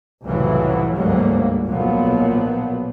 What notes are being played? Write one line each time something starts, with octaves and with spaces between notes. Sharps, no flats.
C2 F2 A2 C#3 E3 F#3
G1 D2 G#2 F#3 G3 A#3
B1 A#2 F3 F#3 B3